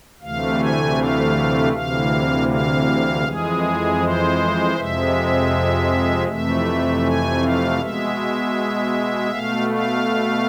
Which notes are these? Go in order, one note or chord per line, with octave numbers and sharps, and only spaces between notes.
D2 C3 E3 A3 F5
G#5
F5
D2 C3 E3 F5
F5
F2 E3 G#3 G#4
C5
F2 C3 F3 G#3 E5
F2 C3 E3 A3 E5
G#5
F5
B2 G#3 E5
B2 A3 F5
F5